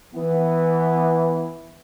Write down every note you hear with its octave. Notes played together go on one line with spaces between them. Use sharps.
E3 B3